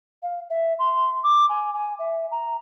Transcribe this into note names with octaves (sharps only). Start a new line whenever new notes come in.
F5
E5
C6
D6
G#5
G#5
E5
A#5